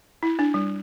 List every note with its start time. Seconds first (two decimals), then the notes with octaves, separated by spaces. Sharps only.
0.23 E4
0.39 D4
0.54 G3